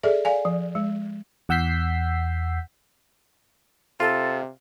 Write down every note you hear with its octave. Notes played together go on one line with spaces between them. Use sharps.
G#4 A4 D5 E5
D5 F5 G#5
F3
G#3
E2 F#5 E6 G6 B6 C7
C3 F4 A4